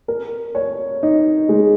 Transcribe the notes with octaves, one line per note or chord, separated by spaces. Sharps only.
A#4
C#5
D#4
G#3